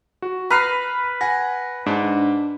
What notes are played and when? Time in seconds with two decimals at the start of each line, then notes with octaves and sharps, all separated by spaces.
0.22 F#4
0.50 B4 A#5 F6 C7
1.21 F#5 G#5 A#6
1.86 G#2 D4